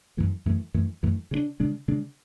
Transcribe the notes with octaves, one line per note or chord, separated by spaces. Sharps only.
F#2 E3 A3
F#2 E3 A3
F#2 E3 A3
F#2 E3 A3
C#3 G#3 D4
C#3 G#3 D4
C#3 G#3 D4